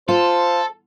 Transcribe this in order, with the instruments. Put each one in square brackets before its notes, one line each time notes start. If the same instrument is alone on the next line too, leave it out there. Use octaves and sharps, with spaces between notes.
[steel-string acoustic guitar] F4 [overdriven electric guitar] A4 [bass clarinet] C5